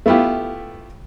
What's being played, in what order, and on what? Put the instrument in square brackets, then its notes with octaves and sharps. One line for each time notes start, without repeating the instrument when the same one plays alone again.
[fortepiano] A3 B3 E4 F4 G4